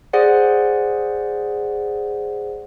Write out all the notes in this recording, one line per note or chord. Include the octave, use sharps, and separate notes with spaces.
G#4 C5 D5 F#5